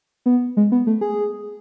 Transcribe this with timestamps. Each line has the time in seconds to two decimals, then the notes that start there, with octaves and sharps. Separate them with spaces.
0.26 B3
0.57 G#3
0.72 B3
0.87 A3
1.01 G#4